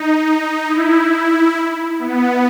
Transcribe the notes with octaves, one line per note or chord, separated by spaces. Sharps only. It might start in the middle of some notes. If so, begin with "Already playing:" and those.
Already playing: D#4
E4
B3